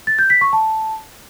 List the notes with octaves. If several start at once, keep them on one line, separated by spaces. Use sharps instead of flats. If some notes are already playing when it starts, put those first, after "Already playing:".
A6
G6
B6
C#6
A5